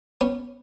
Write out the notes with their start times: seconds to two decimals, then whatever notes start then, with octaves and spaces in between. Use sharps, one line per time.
0.21 B3 C#4